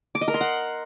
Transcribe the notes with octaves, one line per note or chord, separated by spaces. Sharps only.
D6
D#5
A#4
C6
F#5